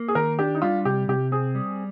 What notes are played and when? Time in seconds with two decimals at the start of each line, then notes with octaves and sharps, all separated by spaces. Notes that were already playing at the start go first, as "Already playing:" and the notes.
Already playing: A#3
0.08 G#4
0.15 D#3 A#4
0.39 D4 G4
0.55 D#4
0.62 G3 F4
0.85 C3 G4
1.08 C3 G4
1.32 C4 G#4
1.55 G3